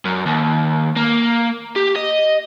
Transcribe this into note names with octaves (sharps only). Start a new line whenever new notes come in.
F#2
D#2
A#3
G4
D#5